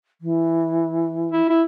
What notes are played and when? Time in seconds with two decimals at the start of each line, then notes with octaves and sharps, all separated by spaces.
0.21 E3
1.32 E4
1.49 E4